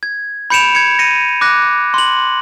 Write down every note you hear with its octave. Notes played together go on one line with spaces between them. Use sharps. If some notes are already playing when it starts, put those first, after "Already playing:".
G#6
B5 G6 C#7 D7 E7 F7
G#6 C#7
A#6 C#7 D#7
D6 F#6 A#6
C6 F#7